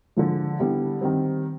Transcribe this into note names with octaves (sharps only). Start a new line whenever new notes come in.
D3 F3 G#3
D3 G3 B3 E4
D#3 G3 C4